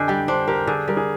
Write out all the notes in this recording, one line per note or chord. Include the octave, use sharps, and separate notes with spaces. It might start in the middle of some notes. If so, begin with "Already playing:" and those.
Already playing: D3 D4 G4 D#5 G#5
G3 G5
D4 C5
G4 A#4
D3 G#4
G3 A#4
G#4